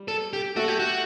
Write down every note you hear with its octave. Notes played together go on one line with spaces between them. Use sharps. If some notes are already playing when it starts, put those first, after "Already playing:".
Already playing: G3
A4
G4
A3 F#4 A4
G4
F#4